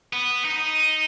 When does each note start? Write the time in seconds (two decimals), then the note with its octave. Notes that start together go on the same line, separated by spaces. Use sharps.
0.13 B3
0.45 D#4